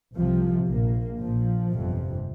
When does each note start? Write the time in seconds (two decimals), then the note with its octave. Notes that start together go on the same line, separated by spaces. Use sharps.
0.15 C2 C3 F3
0.67 A#1 A#2 A#3
1.19 A#1 A#2 F3
1.72 G1 F2 C3